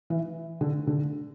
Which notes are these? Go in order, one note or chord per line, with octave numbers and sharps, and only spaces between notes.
E3
D3
D3